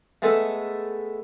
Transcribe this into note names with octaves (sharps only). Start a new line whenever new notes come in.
G#3 A3 B3 A4